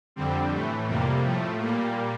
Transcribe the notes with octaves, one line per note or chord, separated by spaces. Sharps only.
F2 D3 G3 C4
A2 E3 A3
F2 C3 G3 A#3
A2 F3 A3
A#2 G3 A#3